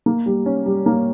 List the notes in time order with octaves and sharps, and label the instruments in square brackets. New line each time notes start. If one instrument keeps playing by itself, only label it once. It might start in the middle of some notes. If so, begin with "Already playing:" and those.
[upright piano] A#3
G3
C#4
G3
A#3